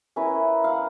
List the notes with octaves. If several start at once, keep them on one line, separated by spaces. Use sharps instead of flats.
C#4 E4 A#4 B4
F5 F#5